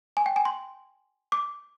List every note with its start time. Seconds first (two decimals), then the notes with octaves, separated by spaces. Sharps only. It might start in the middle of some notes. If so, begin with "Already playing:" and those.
0.17 G#5
0.26 G5
0.36 G#5
0.45 C6
1.32 D6